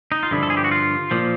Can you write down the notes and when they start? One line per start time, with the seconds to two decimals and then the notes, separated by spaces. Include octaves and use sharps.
0.12 D#4
0.23 F4
0.31 G2 D3 F3 E4
0.43 A4
0.50 G#4
0.57 G4
0.64 F#4
0.71 F4
1.11 A#2 F3